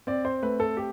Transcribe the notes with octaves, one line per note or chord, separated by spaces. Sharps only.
C4 D5
C5
A3 B4
A4
G4